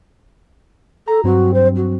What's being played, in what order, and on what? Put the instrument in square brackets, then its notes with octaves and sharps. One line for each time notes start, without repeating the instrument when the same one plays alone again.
[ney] A4 [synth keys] A#5
[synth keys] G2 F#3 C4 [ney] F#4
[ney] C5
F#4